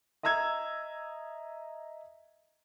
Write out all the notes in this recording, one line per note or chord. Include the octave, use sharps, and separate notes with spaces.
D#5 E5 A#5 E6 G#6